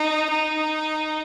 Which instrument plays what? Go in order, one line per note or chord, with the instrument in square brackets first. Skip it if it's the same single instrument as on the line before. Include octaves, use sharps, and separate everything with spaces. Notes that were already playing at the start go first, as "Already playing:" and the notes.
Already playing: [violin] D#4
D#4